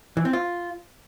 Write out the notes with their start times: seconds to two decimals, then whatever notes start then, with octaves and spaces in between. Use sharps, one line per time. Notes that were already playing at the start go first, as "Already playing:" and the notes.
0.17 E3
0.25 C4
0.33 F4